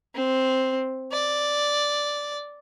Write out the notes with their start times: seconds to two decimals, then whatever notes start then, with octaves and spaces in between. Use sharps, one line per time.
0.15 C4
1.12 D5